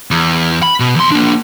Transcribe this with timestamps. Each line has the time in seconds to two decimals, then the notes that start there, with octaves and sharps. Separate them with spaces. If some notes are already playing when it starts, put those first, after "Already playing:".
0.11 E2
0.63 B5
0.80 B2
0.96 E2 C6
1.12 A#3 D4